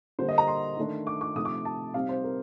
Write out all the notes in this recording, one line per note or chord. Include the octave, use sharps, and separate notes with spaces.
D3 G3 A#3 C5
D#5
A#5
C6
D#3 A3 D4
D6
D6
C3 F3 A3 D#4 D#6
D6
A5
C3 G3 C4 D#4 F5
C5
A#4